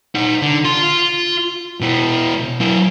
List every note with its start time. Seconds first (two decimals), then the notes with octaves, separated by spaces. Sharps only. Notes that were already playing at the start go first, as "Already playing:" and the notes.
0.15 D#4 F#5
0.42 D3
0.65 F4 C6
1.81 B2 E4
2.60 F#3 E4